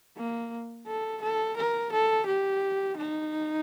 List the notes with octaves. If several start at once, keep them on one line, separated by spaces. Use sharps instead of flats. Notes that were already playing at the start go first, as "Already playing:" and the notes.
A#3
A4
A4
A#4
A4
G4
D#4